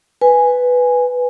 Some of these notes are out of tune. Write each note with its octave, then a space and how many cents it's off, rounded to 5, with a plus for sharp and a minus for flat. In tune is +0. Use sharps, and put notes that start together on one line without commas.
B4 +0 G#5 -5